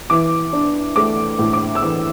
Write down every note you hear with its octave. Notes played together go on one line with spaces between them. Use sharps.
E3 D6
D4
A3 D6
A2
D6
E6
E3 D6